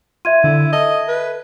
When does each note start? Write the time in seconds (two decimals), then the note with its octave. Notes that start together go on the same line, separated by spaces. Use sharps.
0.25 F4 E5 G#6 D#7
0.44 D3 E4
0.73 A4 D#5
1.08 B4